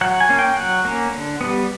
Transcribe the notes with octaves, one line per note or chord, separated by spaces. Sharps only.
F#3 F#5
G#5
A#3 C#4
G5
F#3 F#5
A#3 C#4
D3
G3 B3